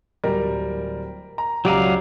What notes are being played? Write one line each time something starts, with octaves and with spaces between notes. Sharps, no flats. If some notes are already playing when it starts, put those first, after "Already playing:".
D1 G3 A#4
A#5
C#2 F#3 G4 D5 F5 A#5 D#7